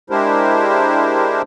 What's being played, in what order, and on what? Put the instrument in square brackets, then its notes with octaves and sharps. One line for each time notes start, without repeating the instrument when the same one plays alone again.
[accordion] G#3 D4 E4 G4 A#4 C5